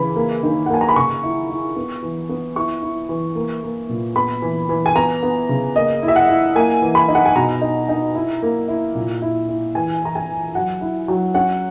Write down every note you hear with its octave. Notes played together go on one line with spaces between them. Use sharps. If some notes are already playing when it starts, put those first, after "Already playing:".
Already playing: C#3 E3 B5
A#3
D#3
F#5
A#3 G#5
A#5
B5
C#3 C#6
E4
E4
B3
E3
B3
E4 C#6
E4
E3
A#3
A#3
A#2
B3 B5
E3
E3
G#5
B3 A#5
B3
C#3
A#3 D#5
E4
E5
F#5
E4
A#3 G#5
E3
B5
D#4
F#5
G#5
B2 A#5
D#4
D#4
E4
A#3
E4
A#2
E4
E4
E3 G#5
E3 A#5
G#5
E3
F#3 F#5
E4
F#3
C#4 F#5